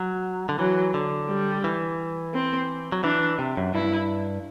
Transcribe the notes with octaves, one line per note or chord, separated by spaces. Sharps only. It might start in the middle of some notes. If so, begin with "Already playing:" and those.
Already playing: F#3
D3
E3 F#3
D3
G3
E3
C4
F#3
E3 D4
C3
F#2
G2 E4